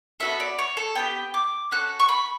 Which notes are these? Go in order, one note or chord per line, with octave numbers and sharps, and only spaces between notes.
B3 F#4 A4 E5
D5
C#5
A4
B3 E4 G4 G5
D6
C#4 F#4 A4 F#6
C#6
B5